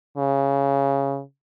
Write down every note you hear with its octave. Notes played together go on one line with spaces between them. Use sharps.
C#3